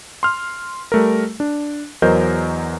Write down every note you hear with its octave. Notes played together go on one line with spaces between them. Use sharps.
C6 F6
G3 A3 A#4
D4
E2 F#3 A#4 C5 D#5 G6